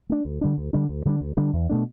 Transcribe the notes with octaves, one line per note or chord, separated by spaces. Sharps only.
A3 D4
D2
D3 G3 D4
D2
D3 G3 D4
D2
D3 G3 D4
D2
D3 G3 D4
E2
B2 A3 D4